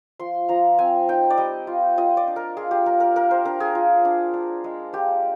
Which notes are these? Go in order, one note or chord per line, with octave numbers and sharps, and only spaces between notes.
F3 C6
F3 A#5
C4 G#5
D#4 G5
D5
G3 D#5
F4
F4 D#5
D5
D4
A#4
F4 G#4
G4
A#3 A#4
A#4
A#3 A#4
C5
D4 A#4
G#4
F4
D4
D4
G#3
A#3 G4